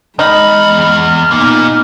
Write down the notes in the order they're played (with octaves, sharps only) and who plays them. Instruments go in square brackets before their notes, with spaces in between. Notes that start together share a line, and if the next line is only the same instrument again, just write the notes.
[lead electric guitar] E2 B5 [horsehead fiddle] G#3 [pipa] D#4 [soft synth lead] F6
[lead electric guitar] A#2 A#3 [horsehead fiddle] B3 D#4